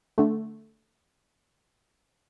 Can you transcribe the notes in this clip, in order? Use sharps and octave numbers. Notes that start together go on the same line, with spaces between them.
D3 A3